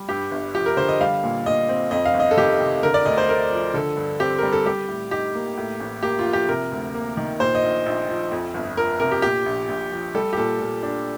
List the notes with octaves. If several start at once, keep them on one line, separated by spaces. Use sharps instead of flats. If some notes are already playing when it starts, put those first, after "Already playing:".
Already playing: G3
G2 G4
G1
F3 G4
A#4
D3 C5
D#5
G3 F5
A#2
A#2 D#5
C4
F2 D#5
F5
G1
D#5
A4
D#3 G4
C3
D3 A#4
D5
D2 D#5
C5
A3 A#4
F3
D3 A4
G2
C4 G4
G3 A#4
A4
G3 G4
A2
D#4 G4
A#3
A2
A1
A#3 G4
F4
F3
G4
C3 A#4
D2
A#3
D#3
A#2 C5
D#5
A#1
A#1
F3
F2
G1
F3 A#4
C3 A#4
G4
A#2 G4
A#1
A#1
F3
G3 A4
G4
A#2 A4
A#2
D4